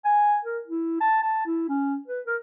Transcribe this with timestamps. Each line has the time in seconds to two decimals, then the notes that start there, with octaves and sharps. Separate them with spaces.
0.05 G#5
0.45 A#4
0.67 E4
1.01 A5
1.22 A5
1.46 E4
1.69 C#4
2.08 B4
2.27 A#4